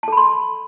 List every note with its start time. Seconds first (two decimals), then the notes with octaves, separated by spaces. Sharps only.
0.03 A5
0.08 A4
0.12 B5
0.17 C6